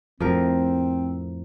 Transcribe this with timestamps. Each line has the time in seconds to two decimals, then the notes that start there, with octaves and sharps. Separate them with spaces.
0.20 F2 A2 F3 C4 A#4